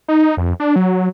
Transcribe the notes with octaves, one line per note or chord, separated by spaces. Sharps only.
D#4
F2
D4
F#3